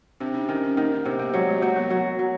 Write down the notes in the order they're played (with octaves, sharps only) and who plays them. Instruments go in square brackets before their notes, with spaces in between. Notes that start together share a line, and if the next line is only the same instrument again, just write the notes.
[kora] C3 [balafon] C4 D4
[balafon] C#4 D#4
[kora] D#3 [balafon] C#4
[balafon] C4
[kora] D#3 [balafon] A#3
[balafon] A#3
[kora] C3 [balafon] B3
[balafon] A#3
[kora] F#3 [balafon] G#3
[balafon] A3
[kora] F#3 [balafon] A#3
[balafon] B3
[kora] F#3
F#3